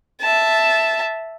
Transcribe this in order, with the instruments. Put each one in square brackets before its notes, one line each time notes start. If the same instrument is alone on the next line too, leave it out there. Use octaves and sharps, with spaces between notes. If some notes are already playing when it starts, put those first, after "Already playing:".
[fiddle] E5 A5